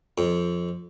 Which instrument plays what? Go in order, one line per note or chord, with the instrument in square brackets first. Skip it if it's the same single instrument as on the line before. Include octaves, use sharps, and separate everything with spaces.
[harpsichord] F2